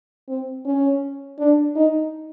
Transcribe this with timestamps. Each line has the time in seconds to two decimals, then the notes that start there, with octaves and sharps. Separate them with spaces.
0.28 C4
0.65 C#4
1.38 D4
1.76 D#4